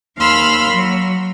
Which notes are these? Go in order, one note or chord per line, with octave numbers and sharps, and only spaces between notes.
D#2 F5 B5 C6 E6 F6
F#3